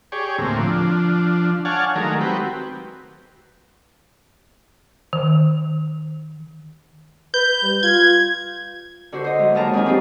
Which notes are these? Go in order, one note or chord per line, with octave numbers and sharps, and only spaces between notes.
G4 G#4 C#5 D5
D2 A2 A#3 C4
F3 D4
C#5 D5 F5 F#5 G#5 A5
D#3 F#3 G#3 A3 A#4
C4 F#4 G4 B4
D#3
B4 G6
G3
F4 G#6
D3 F#4 C5
C5 D#5
F#3 G#3
D#2 D#3 F#3 D#5 A5 A#5
F2 G#3 D4 D#4 G#5
C4 D4 D#4 G4 G#4 C5